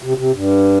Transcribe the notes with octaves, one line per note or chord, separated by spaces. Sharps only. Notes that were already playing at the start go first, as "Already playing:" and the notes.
C3
C3
G2